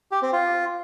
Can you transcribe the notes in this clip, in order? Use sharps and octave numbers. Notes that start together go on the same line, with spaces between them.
G4
C4
F4